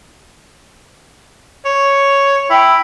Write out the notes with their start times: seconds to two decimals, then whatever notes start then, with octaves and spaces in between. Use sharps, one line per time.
1.65 C#5
2.50 E4 G5